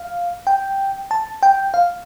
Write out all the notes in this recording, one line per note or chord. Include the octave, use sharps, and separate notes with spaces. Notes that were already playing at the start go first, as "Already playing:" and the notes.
Already playing: F5
G5
A5
G5
F5